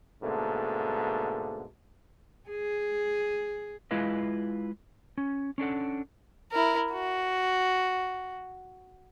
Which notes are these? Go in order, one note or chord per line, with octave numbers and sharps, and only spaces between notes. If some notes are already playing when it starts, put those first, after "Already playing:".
G#2 B2 D3 A3 A#3
G#4
G#3 E4 F4 B4 D#5 F5
C#4
C#4 D4 A4 F#5
E4 A#4
F#4